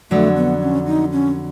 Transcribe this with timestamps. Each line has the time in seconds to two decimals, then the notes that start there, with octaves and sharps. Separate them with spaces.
0.11 F2 D3 F#3 A3
0.36 B3
0.61 C#4
0.87 D#4
1.12 C#4